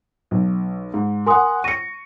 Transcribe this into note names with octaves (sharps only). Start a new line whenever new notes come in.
B1
G#2
A#4 F#5 G#5 C6 D#6
C#6 A#6 C#7 D#7